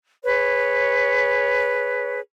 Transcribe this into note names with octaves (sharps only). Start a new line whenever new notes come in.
G#4 B4 C#5